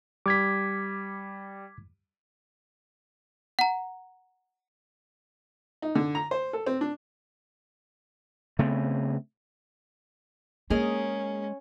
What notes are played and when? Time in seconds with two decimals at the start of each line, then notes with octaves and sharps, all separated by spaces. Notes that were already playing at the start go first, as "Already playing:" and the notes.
0.26 G3 D6 G#6 B6
3.59 F#5 A#5
5.82 D#4
5.95 D3
6.15 A#5
6.31 C5
6.53 A4
6.66 C4
6.81 D4
8.59 C#3 A3 B3 C4
10.70 G#3 A#3 C#4 G#4 A#4 D#5